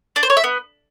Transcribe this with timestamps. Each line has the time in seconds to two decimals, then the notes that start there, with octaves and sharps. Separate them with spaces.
0.16 D4
0.23 C5
0.30 C#5
0.37 E5
0.44 B3